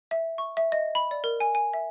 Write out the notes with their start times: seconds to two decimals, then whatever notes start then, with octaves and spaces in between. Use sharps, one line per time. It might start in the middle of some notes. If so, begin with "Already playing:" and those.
0.11 E5
0.38 C#6
0.57 E5
0.72 D#5
0.95 B5
1.11 D5
1.24 A#4
1.40 G#5
1.55 G#5
1.74 E5